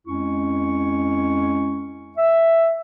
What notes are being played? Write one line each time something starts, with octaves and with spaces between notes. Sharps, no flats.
F2 G#3 C#4 E4 C#6
E5